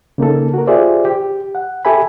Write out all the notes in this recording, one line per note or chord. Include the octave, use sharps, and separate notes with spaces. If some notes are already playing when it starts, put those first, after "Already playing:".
C#3 A#3 D#4 A4
F#4 A#4
F4 G4 G#4 C5 D5 E5
G4
F#5
G4 A4 E5 G#5 B5